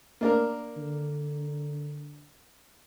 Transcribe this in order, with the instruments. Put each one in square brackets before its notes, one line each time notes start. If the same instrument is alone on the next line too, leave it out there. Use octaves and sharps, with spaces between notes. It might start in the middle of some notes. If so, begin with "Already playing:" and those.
[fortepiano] A#3 D4 A#4
[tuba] D3